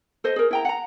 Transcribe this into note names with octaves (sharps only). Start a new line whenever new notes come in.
A4 C5 D#5
G#4 A#4
E4 G5 A#5
F#5 A#5